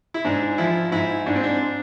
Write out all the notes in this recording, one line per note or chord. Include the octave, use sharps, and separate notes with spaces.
E4
G#2 D4
F3 E4
G#2 E4
G#2 D4
C4
D4